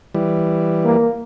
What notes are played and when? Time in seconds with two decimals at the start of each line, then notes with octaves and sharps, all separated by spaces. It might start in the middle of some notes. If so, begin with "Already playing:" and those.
0.15 E3 G3
0.85 A#3